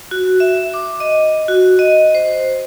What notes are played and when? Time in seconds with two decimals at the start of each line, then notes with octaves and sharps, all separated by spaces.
0.11 F#4
0.40 E5
0.74 D6
1.00 D#5
1.48 F#4
1.79 D#5
2.15 C5